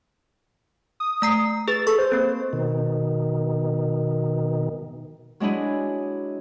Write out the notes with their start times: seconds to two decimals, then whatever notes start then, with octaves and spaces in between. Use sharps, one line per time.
1.00 D#6
1.22 A3 A#5 C7
1.68 G#4 B4 A6
1.87 A4 C#6
1.99 C5
2.12 A#3 C4
2.53 B2 D#3
5.40 F#3 G#3 D4 E4 G#4